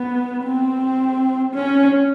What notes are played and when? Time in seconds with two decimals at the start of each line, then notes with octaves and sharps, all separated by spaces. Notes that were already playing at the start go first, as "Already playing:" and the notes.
Already playing: B3
0.44 C4
1.54 C#4